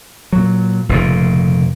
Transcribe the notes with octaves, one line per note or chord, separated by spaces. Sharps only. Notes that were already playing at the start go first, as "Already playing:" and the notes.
A#2 F#3
F1 A#2 C#3